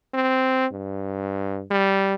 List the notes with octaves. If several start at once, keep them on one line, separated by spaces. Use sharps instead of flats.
C4
G2
G3